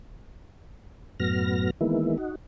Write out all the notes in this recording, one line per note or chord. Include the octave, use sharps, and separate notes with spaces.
F#2 A2 F#3 B3 F6 A#6
D#3 E3 G#3 A#3 B3 E4
D#4 F#4